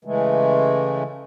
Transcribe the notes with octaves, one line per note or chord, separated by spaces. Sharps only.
C#3 E3 G#3 A3